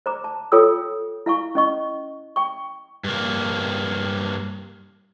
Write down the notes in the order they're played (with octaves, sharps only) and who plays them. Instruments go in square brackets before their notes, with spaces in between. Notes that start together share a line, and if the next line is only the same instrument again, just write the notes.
[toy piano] C5 A#5 D6
A5
F4 A4 C#5 G5 D#6 E6
E4 F5 G#5 C#6
C#4 D#5 C#6
G5 C#6
[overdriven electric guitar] G2 A#3